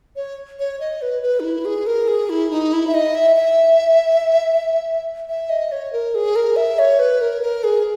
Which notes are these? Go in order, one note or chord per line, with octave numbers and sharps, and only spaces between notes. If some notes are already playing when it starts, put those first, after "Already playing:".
C#5
C#5
D#5
B4
B4
D#4
E4
G#4
A#4
G#4
E4
D#4
E4
E5
D#5
E5
E5
E5
D#5
C#5
A#4
G#4
A#4
E5
C#5
B4
A#4
A#4
G#4